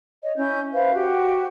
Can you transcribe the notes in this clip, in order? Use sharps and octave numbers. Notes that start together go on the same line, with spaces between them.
C#5 D#5
C#4 E4 G6
B4 C5 E5 F5
F#4 G4